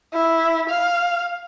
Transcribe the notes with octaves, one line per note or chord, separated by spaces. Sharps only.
E4
F5